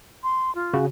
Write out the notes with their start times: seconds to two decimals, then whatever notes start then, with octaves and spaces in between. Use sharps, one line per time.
0.23 C6
0.55 F4
0.74 C#3 F#4